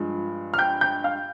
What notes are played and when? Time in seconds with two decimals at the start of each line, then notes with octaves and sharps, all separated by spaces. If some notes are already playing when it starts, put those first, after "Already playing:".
Already playing: G2 F3 G#3
0.54 F6
0.58 G5 G6
0.81 G5 G6
1.04 F5 F6